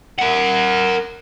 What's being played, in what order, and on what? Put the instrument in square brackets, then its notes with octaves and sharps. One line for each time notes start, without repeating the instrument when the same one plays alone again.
[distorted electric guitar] A#4 F#5